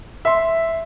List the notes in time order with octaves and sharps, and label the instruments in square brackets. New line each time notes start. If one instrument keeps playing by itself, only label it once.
[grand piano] E5 C6